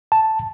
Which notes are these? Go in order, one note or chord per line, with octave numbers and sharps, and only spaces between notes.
A5